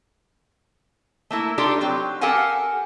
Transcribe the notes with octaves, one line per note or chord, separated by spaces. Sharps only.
A3 A#3 E4
D4 D#4 F4 G4 A4
F#3 C4 G4
G4 A4 A#4 F5 F#5 G#5